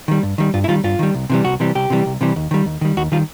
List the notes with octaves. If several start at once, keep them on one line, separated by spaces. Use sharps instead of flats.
D#3 G3
G2
D#3 G3
G2 F4
E4
D#3 G3 F4
G2 F4
D#3 G3
C2
C3 E3 G3
C2 F#4
C3 E3 G3
C2 G4
C3 E3 G3
C2
C3 E3 G3
D#2
D#3 G3
D#2
D#3 G3
D#2 F#4
D#3 G3 F4